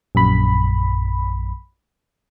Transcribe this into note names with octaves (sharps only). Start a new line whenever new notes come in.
A#1 F#2 B5